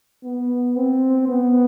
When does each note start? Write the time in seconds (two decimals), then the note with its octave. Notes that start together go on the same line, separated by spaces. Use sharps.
0.24 B3
0.76 C4
1.27 B3